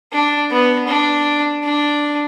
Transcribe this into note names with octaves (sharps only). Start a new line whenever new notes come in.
D4
B3
D4
D4